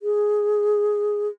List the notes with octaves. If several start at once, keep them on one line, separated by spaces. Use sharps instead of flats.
G#4